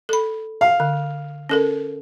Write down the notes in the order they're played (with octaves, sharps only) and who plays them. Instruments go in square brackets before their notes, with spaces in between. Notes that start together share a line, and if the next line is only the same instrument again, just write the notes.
[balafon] A4 B5
[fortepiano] F5
[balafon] D3
C#4 A4 A#4